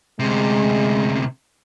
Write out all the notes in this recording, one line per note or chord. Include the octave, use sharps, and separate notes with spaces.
D2 C3 G#3